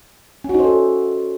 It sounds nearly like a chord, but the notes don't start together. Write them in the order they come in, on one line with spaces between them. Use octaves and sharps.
C#4 F#4 D#4 C5 A4